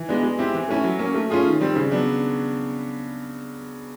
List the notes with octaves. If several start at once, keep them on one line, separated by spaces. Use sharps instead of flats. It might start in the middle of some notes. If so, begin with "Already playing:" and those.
Already playing: E3
G#3 B3 D4
G#3
C4 E4 G4
E3
A3 C#4 E4
F#3
A#3 C#4
A3
C#4 F4 G#4
D#3
G3 C4
C#3
F#3 B3 D4